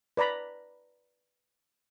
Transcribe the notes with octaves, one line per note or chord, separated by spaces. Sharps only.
B4 D5 A#5 B5